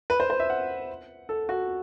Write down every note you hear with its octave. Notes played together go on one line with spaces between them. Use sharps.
B4
C5
C5
E5
F#5
A4
F#4